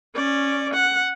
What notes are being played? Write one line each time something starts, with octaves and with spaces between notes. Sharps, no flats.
C#4 D5
F#5